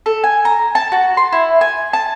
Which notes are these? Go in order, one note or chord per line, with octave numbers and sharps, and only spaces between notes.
A4
G#5
A#5
A5
F#4
C6
E4
G#5
A5